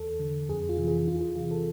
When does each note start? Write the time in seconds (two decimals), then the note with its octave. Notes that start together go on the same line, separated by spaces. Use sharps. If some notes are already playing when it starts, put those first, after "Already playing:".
Already playing: E2 A4
0.20 D3
0.49 F2 G#4
0.69 F4
0.78 C3 E3
0.88 G#4
1.08 E2 F4
1.21 G#4
1.36 C3 E3 F4
1.51 A4